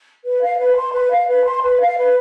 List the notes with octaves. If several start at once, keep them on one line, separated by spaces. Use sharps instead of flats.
B4
F5
B4
C6
B4
F5
B4
C6
B4
F5
B4